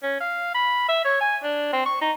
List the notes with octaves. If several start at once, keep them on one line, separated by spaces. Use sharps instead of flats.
C#4
F5
B5
E5
C#5
G#5
D4
C4
C#6
D#4